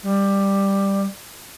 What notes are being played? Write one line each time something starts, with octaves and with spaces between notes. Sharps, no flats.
G3